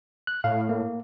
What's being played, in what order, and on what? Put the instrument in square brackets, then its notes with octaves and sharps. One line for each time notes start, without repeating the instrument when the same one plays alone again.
[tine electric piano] F#6
[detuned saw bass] A2 [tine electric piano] F5
[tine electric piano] A#3